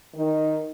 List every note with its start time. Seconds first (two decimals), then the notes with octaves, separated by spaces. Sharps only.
0.14 D#3